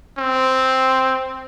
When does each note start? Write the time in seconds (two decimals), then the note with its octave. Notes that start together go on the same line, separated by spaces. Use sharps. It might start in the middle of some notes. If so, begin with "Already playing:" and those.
0.18 C4